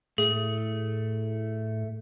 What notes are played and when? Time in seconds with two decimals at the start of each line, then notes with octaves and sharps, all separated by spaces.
0.18 A2 A3 G#4